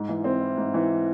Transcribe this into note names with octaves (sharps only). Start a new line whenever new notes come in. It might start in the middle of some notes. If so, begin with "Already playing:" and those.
Already playing: G#2
E3
C4
E4
G#2
E3